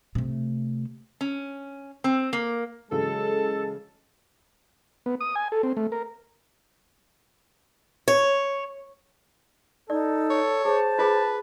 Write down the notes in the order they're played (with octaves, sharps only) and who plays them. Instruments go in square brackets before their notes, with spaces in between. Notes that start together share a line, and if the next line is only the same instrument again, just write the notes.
[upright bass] C3 A3
[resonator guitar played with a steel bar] C#4
C4
A#3
[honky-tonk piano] C#3 E3 F#3 [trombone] G#3 [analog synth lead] A4 [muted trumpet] A5
[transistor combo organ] B3
D#6
G#5
A4
C4
A3
A#4
[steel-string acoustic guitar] C#5
[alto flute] D#4 [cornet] A4 [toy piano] D5
[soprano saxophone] C#5
[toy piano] G#4 [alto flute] C5 [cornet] A5
[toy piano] F4 G#4 [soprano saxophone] B4